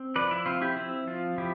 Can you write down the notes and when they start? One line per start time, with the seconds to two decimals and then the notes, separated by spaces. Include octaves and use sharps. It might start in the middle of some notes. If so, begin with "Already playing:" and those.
Already playing: C4
0.16 F3 B4 D5
0.31 E4
0.46 C4 F4
0.61 E4 G4
0.76 C4 E4
1.07 F3 F4
1.38 F3 E4 G4